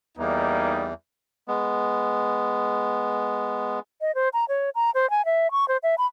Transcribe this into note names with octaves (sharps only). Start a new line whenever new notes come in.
E2 G3 A#3 D#4
G#3 B3
D#5
C5
A#5
C#5
A#5
C5
G#5
E5
C#6
C5
E5
B5